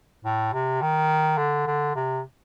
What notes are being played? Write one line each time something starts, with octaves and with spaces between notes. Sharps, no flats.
A2
C3
D#3
D3
D3
C3